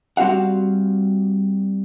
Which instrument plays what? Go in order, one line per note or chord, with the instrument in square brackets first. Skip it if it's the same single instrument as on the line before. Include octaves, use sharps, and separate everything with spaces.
[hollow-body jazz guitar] G3 C4 F#4 F5 F#5